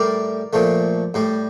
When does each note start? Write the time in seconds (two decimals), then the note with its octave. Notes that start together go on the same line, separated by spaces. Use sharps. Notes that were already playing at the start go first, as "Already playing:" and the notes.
Already playing: A2 G3 A#4 D5
0.53 A#2 F3 A3
1.14 A2 G3